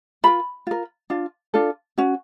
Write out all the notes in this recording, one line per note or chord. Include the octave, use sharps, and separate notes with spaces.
F4 A#4 B5
F4 A#4
D4 F4
D4 F4 A4
C#4 F#4